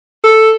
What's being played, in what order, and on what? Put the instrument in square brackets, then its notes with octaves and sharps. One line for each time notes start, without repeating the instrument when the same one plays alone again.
[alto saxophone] A4